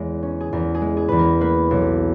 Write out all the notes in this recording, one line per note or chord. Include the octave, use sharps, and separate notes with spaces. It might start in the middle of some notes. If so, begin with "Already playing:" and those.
Already playing: E2 G#3 C#5
C#4
G#4
E2 A#4
G#4
G#3
G#4
E2 B4
A#4
A#3 B4
B1